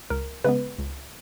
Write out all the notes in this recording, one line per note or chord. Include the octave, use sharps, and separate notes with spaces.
C#2 A#4
C#3 G#3 B3 B4
C#2